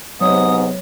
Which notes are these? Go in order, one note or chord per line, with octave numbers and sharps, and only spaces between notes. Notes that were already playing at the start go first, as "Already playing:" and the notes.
G#2 C3 F#3 G#3 B3 C#5 D#6